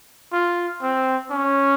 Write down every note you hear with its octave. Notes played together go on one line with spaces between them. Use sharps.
F4
C4
C#4